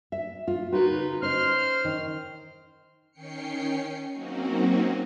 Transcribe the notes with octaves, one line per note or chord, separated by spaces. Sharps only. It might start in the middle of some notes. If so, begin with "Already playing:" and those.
E5
F4
D#4 F4 F#4 A#4 B4
C#3
C#4 D#4 C5 C6 F6
D#3
D#3 C#4 G5 C7 C#7
F#3 A#3 C4 C#4 D#4 F#4